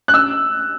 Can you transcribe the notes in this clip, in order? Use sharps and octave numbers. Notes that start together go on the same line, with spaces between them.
F#6
E6